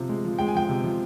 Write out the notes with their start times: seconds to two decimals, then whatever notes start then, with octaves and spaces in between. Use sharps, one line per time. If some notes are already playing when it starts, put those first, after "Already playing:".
Already playing: C3 F3
0.09 G#3
0.24 F3
0.39 G#3 G5
0.48 G#5
0.55 F3 G5
0.69 C3
0.84 F3